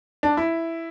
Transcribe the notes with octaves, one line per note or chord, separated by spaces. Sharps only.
D4
E4